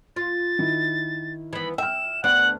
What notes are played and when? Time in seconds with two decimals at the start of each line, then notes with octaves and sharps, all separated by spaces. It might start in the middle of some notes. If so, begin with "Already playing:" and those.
0.16 F4 A6
0.59 D#3 E4
1.53 E3 B3 B5
1.78 E5 G5 F6 E7
2.24 D2 B3 D4 F#5 F#7